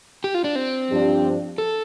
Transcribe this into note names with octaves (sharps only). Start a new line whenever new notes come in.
G4
F4
D4
C4
G2 F3 D4 G4
A4